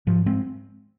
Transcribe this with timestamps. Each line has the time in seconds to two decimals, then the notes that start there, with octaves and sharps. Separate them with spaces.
0.07 G#2 F3
0.26 G#3 C4